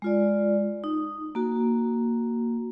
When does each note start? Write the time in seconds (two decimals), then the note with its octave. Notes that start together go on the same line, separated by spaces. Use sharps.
0.02 G#3 F4 D5
0.84 D#4
1.35 A#3 F#4